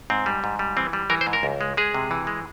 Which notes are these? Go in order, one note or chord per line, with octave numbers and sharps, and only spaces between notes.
G#2 C4
G3
G#2
G3
E3 C4
G3
E3 A#4
C5
G#2
A#4
C#2
G#3
G#3 G#4
C3
E3
G#3